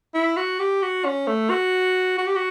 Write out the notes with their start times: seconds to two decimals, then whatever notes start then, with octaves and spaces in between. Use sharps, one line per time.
0.14 E4
0.37 F#4
0.59 G4
0.82 F#4
1.05 C#4
1.27 A3
1.50 F#4
2.18 F#4
2.27 G4
2.35 F#4